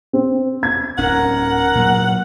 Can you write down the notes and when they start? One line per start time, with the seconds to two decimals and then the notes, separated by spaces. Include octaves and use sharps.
0.13 C4
0.63 G#6
0.98 D1 C#4 A#4 F#5
1.75 A#2 F#3